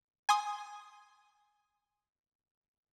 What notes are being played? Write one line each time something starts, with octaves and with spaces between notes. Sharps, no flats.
G#5 C6 D#6